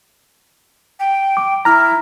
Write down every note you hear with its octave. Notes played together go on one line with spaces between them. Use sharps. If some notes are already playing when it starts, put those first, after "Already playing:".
G5
D6
E4 A#5 F6